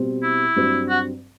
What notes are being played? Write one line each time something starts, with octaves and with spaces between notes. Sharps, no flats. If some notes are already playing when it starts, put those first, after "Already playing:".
Already playing: B2 G3 C4
E4
G2 F#3 C4
F#4